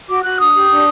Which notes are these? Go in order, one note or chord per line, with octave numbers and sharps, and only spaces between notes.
F#4 D6
F#4 F#6
D4 D#6
G4
D4